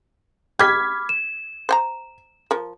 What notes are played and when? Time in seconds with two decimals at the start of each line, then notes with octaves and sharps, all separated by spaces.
0.59 G4 D#5 B5 D6 F6 G#6 B6
1.09 E7
1.69 C5 G5 A#5
2.51 F3 A#4